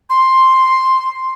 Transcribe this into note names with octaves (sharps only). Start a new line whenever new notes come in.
C6